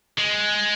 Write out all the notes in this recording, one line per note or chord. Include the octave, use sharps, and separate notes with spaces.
G#3